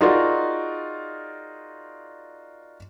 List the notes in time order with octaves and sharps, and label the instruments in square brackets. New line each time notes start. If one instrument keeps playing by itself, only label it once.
[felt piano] D#4 F4 F#4 G#4 A#4 D5